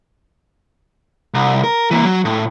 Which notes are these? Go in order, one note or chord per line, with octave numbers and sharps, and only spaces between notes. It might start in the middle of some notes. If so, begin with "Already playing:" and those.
C2
A#4
E3 A#3
F#3
A2